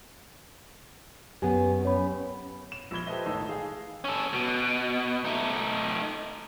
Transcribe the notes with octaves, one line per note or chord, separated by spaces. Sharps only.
F#2 B3 G4 G#5
C#4 C#5 B5
E7
A#1 F3 B5 G#6 G7
G4 A4 B4 C5 D#5 E5
A1 D#3 A3 D#4 A4 E6
G#4 F5
C#4 A4
B2
A3 D#4